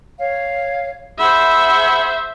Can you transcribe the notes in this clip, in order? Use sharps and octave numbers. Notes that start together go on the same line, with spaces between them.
C#5 F5
G#4 C5 E5 F#5 B5